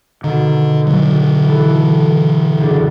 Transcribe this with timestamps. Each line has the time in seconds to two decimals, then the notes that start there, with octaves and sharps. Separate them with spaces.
0.24 B2 D3 D#3
0.87 D3 F#3
1.46 E3 A4
2.60 F#1 D4